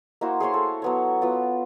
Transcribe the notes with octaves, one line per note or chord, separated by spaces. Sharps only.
A#3 E4 F#4 C5
G#4 C5 C#5 C6
A4
F#3 B3 C#5
B3 F4